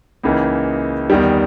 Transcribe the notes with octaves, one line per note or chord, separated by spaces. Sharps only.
C#2 C#3 E3 A#3 D#4
E2 D#3 G3